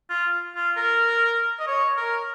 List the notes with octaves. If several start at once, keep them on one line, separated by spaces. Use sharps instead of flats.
F4
F4
A#4
D#5
C#5
A#4